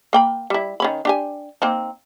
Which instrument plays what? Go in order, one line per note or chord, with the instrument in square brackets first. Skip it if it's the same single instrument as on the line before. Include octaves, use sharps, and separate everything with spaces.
[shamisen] A#3 G5 B5
G3 E4
D#3 C#4 B5
D4 G4 G#5
A#3 C4 D#4